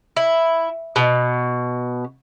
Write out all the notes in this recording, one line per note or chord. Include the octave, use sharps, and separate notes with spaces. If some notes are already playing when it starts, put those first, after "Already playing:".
E4
B2